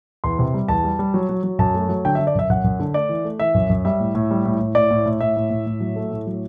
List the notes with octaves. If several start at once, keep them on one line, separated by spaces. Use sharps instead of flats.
E2 C6
C3
G3
E2 A5
G3
G3
F#3
F#3
F#3
F#2 A5
A3
F#3
D3 G5
E5
D3
D5
F#2 E5
F#2 F#5
F#2
D3
A3 D5
E3
A3
E3 E5
F#2
F#2
G3 E5
A2
A2
G3
A2
A2
A2 D5
A2
A2
A2 E5
A2
A2
A2
F#3
A3
A2
F#3